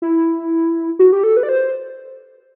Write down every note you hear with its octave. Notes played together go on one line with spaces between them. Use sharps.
E4
F#4
G4
A4
B4
D5
C5